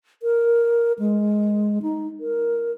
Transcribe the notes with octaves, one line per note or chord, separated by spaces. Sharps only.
A#4
G#3
D#4
A#4